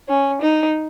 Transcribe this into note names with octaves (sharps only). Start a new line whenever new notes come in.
C#4
D#4